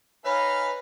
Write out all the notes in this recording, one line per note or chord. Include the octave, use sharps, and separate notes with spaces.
D#4 G#4 B4 C#5 F5 B5